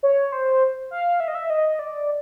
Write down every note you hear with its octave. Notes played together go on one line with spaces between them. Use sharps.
C#5
C5
F5
E5
D#5
E5
D#5
D5